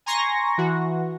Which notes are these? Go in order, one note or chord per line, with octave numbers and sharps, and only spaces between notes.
G#5 A#5 C6 C#6 A#6
E3 F#4